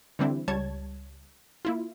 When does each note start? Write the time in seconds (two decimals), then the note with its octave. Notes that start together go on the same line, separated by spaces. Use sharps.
0.19 D3 E3 G3 C4 D4 E4
0.48 C#2 G3 C#5 A5 G#6
1.65 A#3 E4 F4